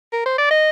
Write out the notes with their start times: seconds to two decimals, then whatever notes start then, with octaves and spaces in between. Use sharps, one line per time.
0.13 A#4
0.26 C5
0.38 D5
0.51 D#5